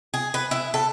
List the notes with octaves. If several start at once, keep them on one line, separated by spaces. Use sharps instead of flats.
G#4
B4
E4
A4